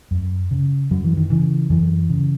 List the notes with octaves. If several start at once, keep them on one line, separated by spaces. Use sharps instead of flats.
F#2
C#3
F#2 F#3
E3
D#3
C#3 E3
F#2 E3
C#3